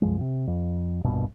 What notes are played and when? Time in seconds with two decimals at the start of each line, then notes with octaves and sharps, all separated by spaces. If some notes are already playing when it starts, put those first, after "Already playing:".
0.02 C2 F#2 F3 G#3
0.21 C3
0.47 F2
1.04 D1 A#1 G2 B2